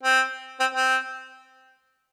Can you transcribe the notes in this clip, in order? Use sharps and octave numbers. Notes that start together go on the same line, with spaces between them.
C4
C4
C4